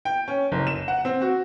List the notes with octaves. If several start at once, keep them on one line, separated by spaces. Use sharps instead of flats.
G5
C#4
F#1
E7
F#5
C4
F#4